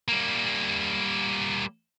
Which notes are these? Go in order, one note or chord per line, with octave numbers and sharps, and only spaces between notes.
G3 A#3